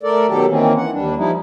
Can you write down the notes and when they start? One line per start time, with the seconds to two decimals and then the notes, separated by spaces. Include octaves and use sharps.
0.03 A3 A4 A#4 D5
0.27 B2 D#3 F#3 G4 A4
0.48 D#3 E3 A#3 C4 C#4
0.77 E3 F#5
0.92 D#2 G3 D4
1.16 F3 G3 D#4 E4